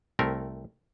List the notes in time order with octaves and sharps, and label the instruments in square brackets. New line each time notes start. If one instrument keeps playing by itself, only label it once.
[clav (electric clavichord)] C2 A3 C4 A#4